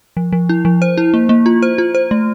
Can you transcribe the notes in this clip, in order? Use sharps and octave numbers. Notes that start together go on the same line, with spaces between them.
F3
F3
E4
F3
C5
E4
A#3
A#3
F4
C5
F4
C5
A3